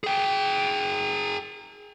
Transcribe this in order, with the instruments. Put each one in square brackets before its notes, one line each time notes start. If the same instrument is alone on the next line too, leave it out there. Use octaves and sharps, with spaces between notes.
[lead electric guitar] G#4 G5